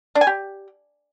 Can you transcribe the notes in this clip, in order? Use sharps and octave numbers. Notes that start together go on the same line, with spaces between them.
D4
G#5
G4